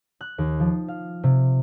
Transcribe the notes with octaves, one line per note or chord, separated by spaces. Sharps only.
F#6
D#2
F3
F5
C3